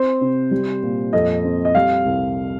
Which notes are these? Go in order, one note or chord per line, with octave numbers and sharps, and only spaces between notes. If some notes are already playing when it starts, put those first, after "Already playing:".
Already playing: C4 C5
C3
G3
A#2
F2 D#5
C4
D#5
G3 F5
C2